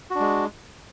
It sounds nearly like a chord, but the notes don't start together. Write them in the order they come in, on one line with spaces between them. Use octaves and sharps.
F#4 D4 G#3